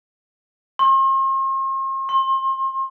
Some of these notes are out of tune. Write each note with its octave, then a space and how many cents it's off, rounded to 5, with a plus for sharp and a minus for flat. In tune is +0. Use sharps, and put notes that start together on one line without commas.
C6 +45
C6 +35